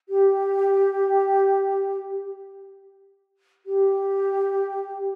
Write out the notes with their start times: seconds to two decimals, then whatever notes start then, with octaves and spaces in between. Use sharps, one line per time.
0.09 G4
3.66 G4